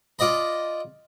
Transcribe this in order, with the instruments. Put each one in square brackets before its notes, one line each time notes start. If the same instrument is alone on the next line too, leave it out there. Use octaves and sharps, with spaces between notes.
[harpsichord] F4 D5 D#5 B5